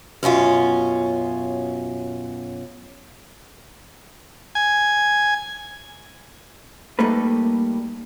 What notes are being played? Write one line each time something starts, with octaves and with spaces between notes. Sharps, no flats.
F#2 B2 C#4 F4
G#5
G3 A3 A#3 D#4 A4 B4